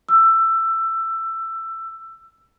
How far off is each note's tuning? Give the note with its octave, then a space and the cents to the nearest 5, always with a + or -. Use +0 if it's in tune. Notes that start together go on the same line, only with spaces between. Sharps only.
E6 +15